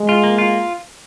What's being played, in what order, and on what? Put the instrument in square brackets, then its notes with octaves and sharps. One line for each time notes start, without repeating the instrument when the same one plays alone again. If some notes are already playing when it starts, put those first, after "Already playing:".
Already playing: [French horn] G#3
[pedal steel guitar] F4
A#3
F4